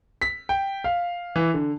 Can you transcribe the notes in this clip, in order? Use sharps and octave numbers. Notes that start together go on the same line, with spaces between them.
B6
G5
F5
E3
D3